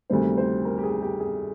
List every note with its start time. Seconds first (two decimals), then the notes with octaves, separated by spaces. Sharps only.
0.10 D2 C3 D#3 G3 C5
0.37 C5
0.65 A#4
0.78 G4
0.83 G#4
1.02 G4
1.20 G#4